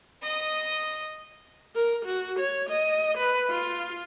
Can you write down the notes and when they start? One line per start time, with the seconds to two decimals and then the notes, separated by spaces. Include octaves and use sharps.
0.23 D#5 D#6
1.75 A#4
2.05 F#4
2.39 C#5
2.69 D#5
3.17 B4
3.50 F4